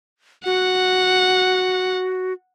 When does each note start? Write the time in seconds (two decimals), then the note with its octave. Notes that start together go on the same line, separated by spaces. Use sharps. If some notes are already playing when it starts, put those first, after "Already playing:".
0.46 F#4 F#5